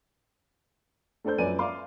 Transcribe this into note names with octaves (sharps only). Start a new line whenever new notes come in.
A3 D4 A4 C5 G6
F#2 F3 B4 D5 G#5 D#7
D5 E5 F5 C6 D6